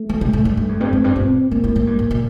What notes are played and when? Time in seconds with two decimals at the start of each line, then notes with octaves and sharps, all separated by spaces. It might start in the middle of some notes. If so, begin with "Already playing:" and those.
Already playing: A3
0.09 F3
0.21 C3
0.33 A2
0.45 G2 A3
0.57 G2
0.69 F2
0.80 G2 C4
0.93 F2
1.04 G2
1.16 A#2 C4
1.51 A#2 A#3
1.64 A2
1.76 A2
1.87 G2
1.99 A2
2.11 A#2